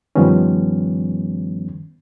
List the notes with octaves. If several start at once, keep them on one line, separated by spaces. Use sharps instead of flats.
G2 D#3 F3 G3 B3 C#4